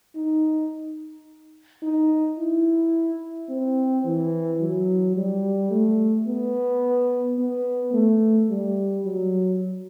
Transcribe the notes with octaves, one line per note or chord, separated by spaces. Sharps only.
D#4
D#4
E4
C4
E3
F#3
G3
A3
B3
B3
A3
G3
F#3